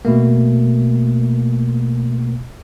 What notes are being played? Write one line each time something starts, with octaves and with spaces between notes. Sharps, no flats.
B2 A3 A#3